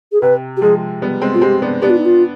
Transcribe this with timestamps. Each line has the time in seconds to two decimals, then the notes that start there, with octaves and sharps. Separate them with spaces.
0.12 G#4
0.21 C3 B4
0.57 G4
0.61 F3 G#3 G#4
1.02 G3 B3
1.21 G#3 C4
1.34 F4
1.41 G#3 C4 G4
1.62 B3 D4
1.82 B3 D4 G4
1.90 F4
1.97 D#4
2.05 F4